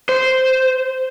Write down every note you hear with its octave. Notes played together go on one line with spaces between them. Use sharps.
C5